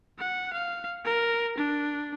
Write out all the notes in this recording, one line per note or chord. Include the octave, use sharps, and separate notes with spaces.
F#5
F5
A#4
D4